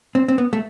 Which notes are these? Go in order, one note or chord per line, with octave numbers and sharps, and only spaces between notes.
C4
C4
B3
A3